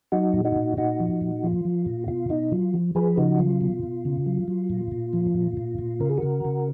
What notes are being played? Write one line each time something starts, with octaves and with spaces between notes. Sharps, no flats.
F#3 D#4 F#4
A#2
D#4 F#4
A#2
A#2 D#4 F#4
F3
A#2
F3 F4
F3
A#2
B2 F4
B2 D#4
F#3 F4
F3
F3 G#4 B4
C#3 D#4 F#4
F#3 F4
B2
B2
C#3
F#3
F#3
A#2
A#2
F3
A#2
A#2
A#2
C#3 A#4
G#4
C#3 F#4 A#4
C#3